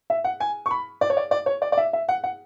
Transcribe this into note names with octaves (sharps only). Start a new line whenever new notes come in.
E5
F#5
G#5
C#6
B5
D5
C#5
D5
D5
C#5
D5
D5
E5
E5
F#5
F#5